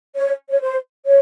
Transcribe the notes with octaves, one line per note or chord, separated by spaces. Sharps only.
C#5
C#5
C5
C#5